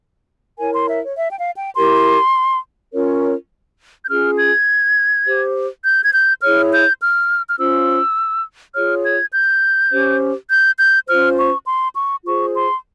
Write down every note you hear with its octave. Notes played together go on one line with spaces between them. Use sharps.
E4 A#4 C#5 G#5
C6
E5
C#5
E5
G5
F5
G5
E4 G4 A#4 C6
C#4 F4 A#4 C#5
G6
C#4 F4 G#4 F6
G#6
G4 C5
G6
G#6
G6
E4 G#4 C#5 F6
G6
F6
F6
C#4 F4 C5 E6
F4 G#4 C#5 F6
G#6
G6
C#4 G4 C5
G6
G6
C#4 F4 C5 F6
C#6
C6
C#6
F4 G#4 C5 C#6
C6